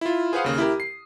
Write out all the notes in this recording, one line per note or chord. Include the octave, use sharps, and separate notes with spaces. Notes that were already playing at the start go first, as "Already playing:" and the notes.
E4 F4
G#4 B4 C5 F5 F#5 D#6
D#2 C#3 A#3
E4 G4 A#4
C7